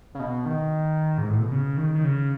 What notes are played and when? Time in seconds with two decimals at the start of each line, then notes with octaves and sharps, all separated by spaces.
0.15 C#3
0.20 B2
0.46 D#3
1.18 G#2
1.29 A2
1.40 B2
1.52 C#3
1.77 D#3
1.95 D#3
2.04 C#3